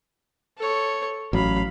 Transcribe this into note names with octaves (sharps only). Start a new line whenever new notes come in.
A4 C#5
A1 F#3 F5 B5